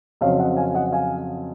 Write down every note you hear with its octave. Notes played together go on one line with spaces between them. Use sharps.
F2 C#3 F#3 C4 C#5 F5
D#5 F#5
F5 G#5
D#5 F#5
F5 G#5